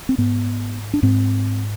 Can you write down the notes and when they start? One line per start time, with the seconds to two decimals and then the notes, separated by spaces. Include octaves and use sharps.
0.09 C4
0.18 G#2 B3
0.94 D4
1.03 G#2 C4